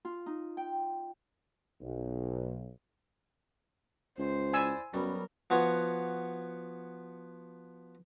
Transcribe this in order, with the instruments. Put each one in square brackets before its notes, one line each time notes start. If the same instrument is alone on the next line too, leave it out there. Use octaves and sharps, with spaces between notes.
[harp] F4
D#4
G5
[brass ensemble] B1
[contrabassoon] C#2 [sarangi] C5
[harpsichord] E4 D5 [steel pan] G#5 E6
[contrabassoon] F#2 [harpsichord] F#3 G3 B3 [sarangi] A#4
[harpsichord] F3 B3 F#4 C#5